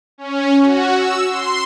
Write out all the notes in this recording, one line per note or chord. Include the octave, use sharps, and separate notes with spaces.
C#4
F#4
E6
C6